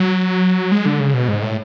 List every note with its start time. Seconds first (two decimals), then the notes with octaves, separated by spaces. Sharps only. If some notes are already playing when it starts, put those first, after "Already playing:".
Already playing: F#3
0.72 G#3
0.86 D3
1.00 C#3
1.14 B2
1.28 G#2
1.42 A2